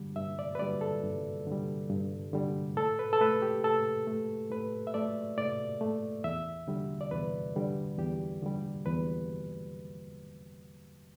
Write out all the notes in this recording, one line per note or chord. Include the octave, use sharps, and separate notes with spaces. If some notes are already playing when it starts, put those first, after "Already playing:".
Already playing: G2 D3 G3
G2 E5
D5
B4
D3 G3 D5
A4
G2
D3 G3
G2
D3 G3
A2 A4
B4
A4
A3 B4
G4
A2 A4
A3
A2 B4
E5
A3 D5
A2 D5
A3
E2 E5
D3 G3
D5
E2 B4
D3 G3
E2 G4
D3 G3
E2 B4